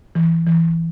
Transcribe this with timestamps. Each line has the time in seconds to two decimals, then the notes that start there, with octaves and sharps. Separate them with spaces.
0.15 E3
0.46 E3